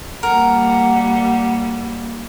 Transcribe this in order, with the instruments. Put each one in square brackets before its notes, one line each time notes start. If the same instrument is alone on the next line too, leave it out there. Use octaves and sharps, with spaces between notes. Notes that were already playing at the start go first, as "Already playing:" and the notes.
[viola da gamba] G3 A#3 [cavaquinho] A#4 [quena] F#5